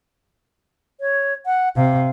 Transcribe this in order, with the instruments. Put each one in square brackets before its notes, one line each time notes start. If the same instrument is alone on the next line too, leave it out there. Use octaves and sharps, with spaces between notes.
[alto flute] C#5
F#5
[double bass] C3 [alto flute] F5